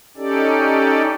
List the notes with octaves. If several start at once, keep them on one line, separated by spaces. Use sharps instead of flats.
C#4 D#4 G4 A4 D5